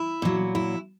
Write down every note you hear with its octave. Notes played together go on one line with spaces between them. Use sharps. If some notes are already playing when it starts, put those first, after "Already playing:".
Already playing: E4
A#2 F#3
E4